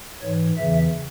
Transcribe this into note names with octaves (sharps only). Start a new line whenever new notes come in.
G#2 E3 C#5
E2 C#3 E3 E5